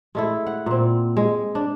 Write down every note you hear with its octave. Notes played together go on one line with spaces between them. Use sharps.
G#3 A3 E4
F#5
A#2 C4
G#3
D4